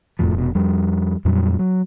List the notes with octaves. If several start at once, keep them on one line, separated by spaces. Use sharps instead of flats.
E1 F2 A2 F3
F1 B2
F2 G3
F2 A#2 F#3 G3
F#3